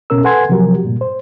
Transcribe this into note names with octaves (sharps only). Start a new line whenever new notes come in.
B2 C#4 A#4 E6
A4 B4 F#5 G#5 C6 G#6
C3 F3 F#3 F#4 G4 A#4
G2 A#2
C5